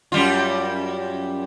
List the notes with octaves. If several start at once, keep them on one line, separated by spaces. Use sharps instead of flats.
F#2 G3 F4